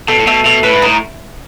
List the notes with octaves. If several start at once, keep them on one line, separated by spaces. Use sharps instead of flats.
B2 A3
A2
B2 A3
B2 A3
A2 B4
G#2
A2 D#4